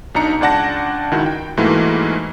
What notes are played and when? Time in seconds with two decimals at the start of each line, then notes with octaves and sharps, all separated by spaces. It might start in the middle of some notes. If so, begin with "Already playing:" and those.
0.15 B1 D4 D#4 A#5 C#7
0.41 C#2 D4 D5 F#5 A5 A#6
1.11 C#2 D#3 E4 F#4
1.26 G5
1.57 G#2 E3 A3 A#3 E4 F#4